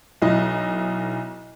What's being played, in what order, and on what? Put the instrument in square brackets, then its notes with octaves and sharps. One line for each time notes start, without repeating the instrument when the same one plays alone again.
[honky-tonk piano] B1 E4 D#5